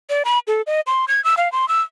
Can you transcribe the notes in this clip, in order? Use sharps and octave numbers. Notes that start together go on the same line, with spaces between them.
D5
B5
A4
D#5
C6
G#6
E6
F5
C6
E6